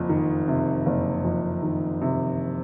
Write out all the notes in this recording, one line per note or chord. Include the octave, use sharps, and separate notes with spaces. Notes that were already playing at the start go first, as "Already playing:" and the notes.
Already playing: F#1 F2
D#3
C3
F#1
F2
D#3
C3